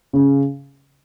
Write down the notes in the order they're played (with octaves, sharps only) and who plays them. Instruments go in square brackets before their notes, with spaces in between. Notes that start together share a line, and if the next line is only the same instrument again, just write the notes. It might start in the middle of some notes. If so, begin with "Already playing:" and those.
[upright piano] C#3